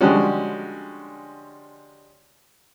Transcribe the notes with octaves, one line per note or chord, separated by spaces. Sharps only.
D3 F3 G3 G#3 C#4 F#4